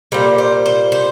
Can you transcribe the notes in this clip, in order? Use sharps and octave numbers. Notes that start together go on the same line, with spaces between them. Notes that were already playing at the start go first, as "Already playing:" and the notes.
A#2 G3 C5
C5
C5
C5